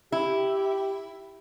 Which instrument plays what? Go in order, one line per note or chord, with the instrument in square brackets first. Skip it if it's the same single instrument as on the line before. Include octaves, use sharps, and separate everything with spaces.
[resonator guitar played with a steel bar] E4 [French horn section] G4